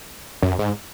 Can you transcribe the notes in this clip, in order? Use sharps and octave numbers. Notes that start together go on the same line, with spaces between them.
F#2
G#2